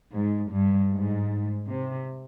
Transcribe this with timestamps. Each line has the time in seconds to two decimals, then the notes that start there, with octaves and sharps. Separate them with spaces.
0.13 G#2
0.51 G2
0.91 G#2
1.69 C3